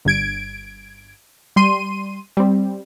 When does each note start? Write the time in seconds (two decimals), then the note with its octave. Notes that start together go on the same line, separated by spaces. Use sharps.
0.05 G1 G2 G#6 D7
1.56 G3 C6 D#7
2.37 G3 C4